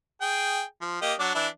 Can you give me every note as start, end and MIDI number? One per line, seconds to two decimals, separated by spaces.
0.21 0.63 68
0.21 0.63 79
0.81 1.01 53
1.02 1.14 58
1.02 1.14 67
1.02 1.14 75
1.19 1.34 54
1.19 1.34 62
1.19 1.34 74
1.35 1.47 52
1.35 1.47 62
1.35 1.47 64